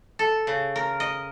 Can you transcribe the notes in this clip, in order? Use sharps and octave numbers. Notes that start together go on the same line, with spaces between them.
A4
C#3
A#4
D#5